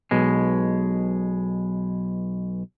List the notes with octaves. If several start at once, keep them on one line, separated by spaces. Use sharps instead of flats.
B1 B2 G#3